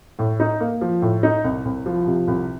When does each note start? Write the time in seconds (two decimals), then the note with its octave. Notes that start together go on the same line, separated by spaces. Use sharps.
0.19 A2
0.40 D#4
0.60 A#3
0.81 F3
1.02 A2
1.23 D#4
1.44 C2
1.65 C2
1.86 F3
2.07 C3
2.27 C2